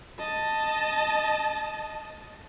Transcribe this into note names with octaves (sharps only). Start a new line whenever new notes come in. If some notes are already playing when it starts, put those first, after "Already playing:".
D#5 A5